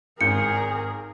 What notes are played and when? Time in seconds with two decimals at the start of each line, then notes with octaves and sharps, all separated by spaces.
0.21 G#1 G#4 A#4 G6 C#7